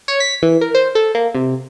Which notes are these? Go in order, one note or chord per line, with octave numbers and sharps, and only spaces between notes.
C#5
B6
E3
A#4
C5
A4
A#3
C3